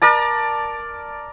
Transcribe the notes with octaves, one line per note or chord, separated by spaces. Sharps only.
A#4 D5 A5